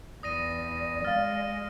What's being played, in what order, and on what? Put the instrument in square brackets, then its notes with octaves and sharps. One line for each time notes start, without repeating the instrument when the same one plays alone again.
[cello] E2 [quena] D5 [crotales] D#6 A#6 D#7
[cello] G#3 [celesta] F5 A6 [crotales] F6